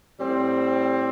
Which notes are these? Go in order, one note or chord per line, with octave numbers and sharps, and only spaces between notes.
A2 G3 C4